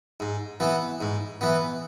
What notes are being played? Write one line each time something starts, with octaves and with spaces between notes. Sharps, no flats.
G#2
E3 B3
G#2
E3 B3